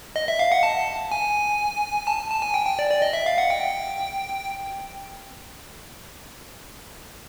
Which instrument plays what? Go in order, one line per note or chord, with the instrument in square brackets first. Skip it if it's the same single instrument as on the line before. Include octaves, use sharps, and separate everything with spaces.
[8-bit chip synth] D#5
E5
F5
F#5
A5
G#5
A5
A5
G#5
G5
G5
D5
D5
D#5
E5
F5
F#5
G5